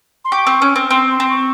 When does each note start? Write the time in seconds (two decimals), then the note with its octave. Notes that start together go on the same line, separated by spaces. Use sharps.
0.25 C6
0.32 G4 C#6
0.47 C4
0.62 C#4
0.76 C4
0.90 C4 C6
1.11 C6
1.20 C4
1.30 C#6